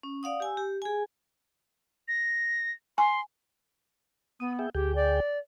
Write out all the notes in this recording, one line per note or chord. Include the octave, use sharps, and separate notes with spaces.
C#4
D5 F5 F#5 D#6
G4 G#5 E6
G4
G#4 G#5
A#6
G#5 C6
B3 D#6
G#4 E5 G5
D2 G4 G#4 G5
D5